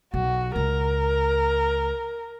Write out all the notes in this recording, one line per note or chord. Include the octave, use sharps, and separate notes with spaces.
B1 F#4
C#2 A#4